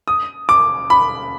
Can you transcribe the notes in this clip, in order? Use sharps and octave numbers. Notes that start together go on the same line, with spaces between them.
D#6
D6
B5